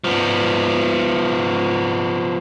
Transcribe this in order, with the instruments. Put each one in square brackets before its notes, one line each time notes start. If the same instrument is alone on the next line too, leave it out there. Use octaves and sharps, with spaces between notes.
[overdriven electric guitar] F3 B3